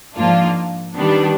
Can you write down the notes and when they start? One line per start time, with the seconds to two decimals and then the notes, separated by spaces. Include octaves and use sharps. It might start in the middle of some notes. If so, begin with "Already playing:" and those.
0.16 G#2 F3 A#3 D4 F4
0.96 D#3 G3 B3 D4